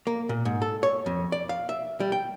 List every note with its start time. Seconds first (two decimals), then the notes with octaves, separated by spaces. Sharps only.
0.07 A#3
0.29 A#2
0.45 G#2
0.62 A4
0.83 C#5
1.06 F2
1.32 D5
1.49 F5
1.69 E5
2.00 G3
2.12 G5